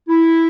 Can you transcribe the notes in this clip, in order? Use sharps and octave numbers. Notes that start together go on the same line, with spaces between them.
E4